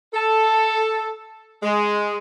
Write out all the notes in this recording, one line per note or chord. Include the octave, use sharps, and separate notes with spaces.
A4
G#3